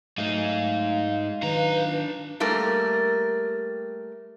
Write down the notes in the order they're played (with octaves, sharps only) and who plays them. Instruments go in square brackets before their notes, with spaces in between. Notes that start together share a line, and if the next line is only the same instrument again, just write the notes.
[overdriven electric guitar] G#2 D#4 [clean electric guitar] F#3 A3 [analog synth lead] F5
[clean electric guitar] D#3 F#3 [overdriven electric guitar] D4 A#5 [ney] B4
[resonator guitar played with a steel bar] G3 A3 A#3 A#4